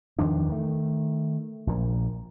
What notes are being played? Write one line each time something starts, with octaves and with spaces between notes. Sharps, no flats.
E2 D#3 F3 D4
D#3 A3
A#1 A#2